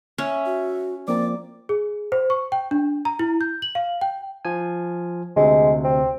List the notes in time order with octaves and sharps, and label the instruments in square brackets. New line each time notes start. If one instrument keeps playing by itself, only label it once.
[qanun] C#4 [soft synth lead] E5
[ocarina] F#4
[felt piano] F3 A#3 C4 [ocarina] D5 [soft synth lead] D6
[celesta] G#4
C5
C#6
G5
D4
A#5
E4
G6
F#7
F5
G5
[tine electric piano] F3 G#5
[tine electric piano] D2 C3 [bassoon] G#3
[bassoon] C4